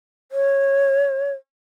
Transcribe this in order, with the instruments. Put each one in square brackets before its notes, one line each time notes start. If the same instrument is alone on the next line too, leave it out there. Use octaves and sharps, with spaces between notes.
[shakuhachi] C#5